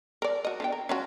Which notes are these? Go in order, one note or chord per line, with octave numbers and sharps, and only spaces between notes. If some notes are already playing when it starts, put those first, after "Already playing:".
A#4 D5
F#4 D#5
D3 B3 G5
A#4
C#4 F4 F#4